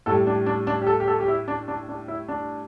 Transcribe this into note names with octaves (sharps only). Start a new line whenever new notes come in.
A2 G3 A4
D4
D4
D4
G4
A4
G4
A4
G4
E4
D4
D4
D4
E4
D4